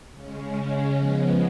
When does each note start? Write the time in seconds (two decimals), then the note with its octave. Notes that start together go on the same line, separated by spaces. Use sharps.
0.12 C#3 G#3 C#4
0.96 F3 G#3 B3